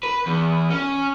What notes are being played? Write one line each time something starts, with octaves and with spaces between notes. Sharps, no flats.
B4
E2
C#4